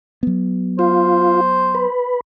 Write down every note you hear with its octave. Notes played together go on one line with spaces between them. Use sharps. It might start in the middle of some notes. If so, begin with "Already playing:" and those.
F#3 B3
F4 C5
B4